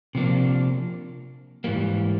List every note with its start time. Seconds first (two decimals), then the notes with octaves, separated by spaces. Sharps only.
0.15 C3 F3 A#3 D4
1.64 G#2 E3 G3 A#3